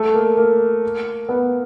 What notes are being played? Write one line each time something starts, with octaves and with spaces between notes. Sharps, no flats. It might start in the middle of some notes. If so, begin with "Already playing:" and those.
Already playing: A3
A#3
A#3
B3